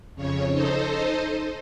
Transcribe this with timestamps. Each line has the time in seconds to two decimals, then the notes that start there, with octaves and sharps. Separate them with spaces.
0.15 F2 C#3 C#5
0.51 D#4 A4 C5 D#5